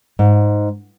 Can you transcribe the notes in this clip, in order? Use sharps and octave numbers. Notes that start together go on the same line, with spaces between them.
G#2